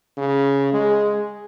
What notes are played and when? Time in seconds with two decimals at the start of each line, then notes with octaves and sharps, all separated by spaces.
0.17 C#3
0.73 G#3